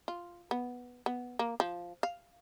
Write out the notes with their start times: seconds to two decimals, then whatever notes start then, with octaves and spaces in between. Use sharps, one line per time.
0.08 F4
0.51 B3
1.06 B3
1.39 A#3
1.60 F3
2.03 F5